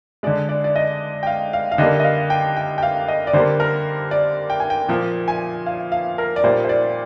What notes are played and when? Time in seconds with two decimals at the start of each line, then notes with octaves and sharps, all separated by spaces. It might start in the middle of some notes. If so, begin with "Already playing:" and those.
0.23 G#3 D5
0.27 D3
0.49 D5
0.64 D5
0.76 D#5
1.23 G5
1.27 F5
1.53 F5
1.72 F5
1.78 D3 G3 A#3 D#5
2.00 D#5
2.04 F5
2.30 G5
2.57 G5
2.78 G5
2.83 F5
3.08 D#5
3.27 D5
3.33 D3 G3 A#3 C5
3.60 A#4
4.11 D5
4.50 G5
4.60 G#5
4.70 G5
4.88 A#2 F3 A#3
5.28 G#5
5.66 F5
5.92 F5
6.18 A#4
6.36 D5
6.44 A#2 G3 A#3 C5
6.65 C5
6.69 D5